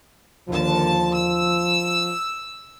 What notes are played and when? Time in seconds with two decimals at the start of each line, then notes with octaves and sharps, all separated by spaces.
0.48 D#2 D3 F3 A5
1.12 E6